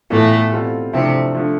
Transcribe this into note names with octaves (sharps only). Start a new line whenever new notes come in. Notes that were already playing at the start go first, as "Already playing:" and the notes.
A2 E3 A3 B3 F4 A4
B2 G3 C4 F4 A4
G2 C3 F3 A3 C4 E4
D3 F3 A3